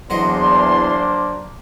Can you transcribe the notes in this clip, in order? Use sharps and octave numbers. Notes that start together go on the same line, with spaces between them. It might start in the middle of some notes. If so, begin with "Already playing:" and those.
E2 D3 F#3 A#3 D4 C5 D#5 C6